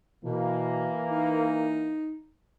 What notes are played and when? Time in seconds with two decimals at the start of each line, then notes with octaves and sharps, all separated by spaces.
0.24 B2 E3 A#3
1.10 D#4